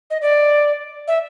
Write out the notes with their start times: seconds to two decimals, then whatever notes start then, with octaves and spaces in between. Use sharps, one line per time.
0.10 D#5
0.22 D5
1.08 E5